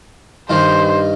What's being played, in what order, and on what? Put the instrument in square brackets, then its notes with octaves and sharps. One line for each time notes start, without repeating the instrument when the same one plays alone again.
[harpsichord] G2 D#3 [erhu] C5